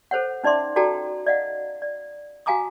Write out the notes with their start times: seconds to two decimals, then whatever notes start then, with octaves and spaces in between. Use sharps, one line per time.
0.11 A4 C5 C#5 F#5
0.44 C#4 D#4 D5 E5 C6 D6
0.76 D#4 F#4 A4 D5 G5 A#5
1.26 D5 D#5 F5 F#5
1.82 D5
2.46 F#4 F5 G#5 A#5 D6 D#6